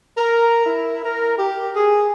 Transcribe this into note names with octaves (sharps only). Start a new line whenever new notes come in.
A#4
E4
A#4
G4
G#4